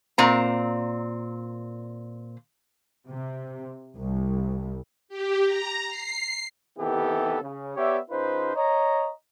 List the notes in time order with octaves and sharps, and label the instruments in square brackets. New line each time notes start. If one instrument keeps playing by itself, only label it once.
[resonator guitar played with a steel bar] A#2 C4 A#5
[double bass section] C3
C2
[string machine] G4
A#5
C7
[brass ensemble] C3 D#3 E3 B3 G4 A4
C#3
B3 G4 C#5 D5 E5
C#3 D#4 F4 B4 C5
C#5 D#5 A#5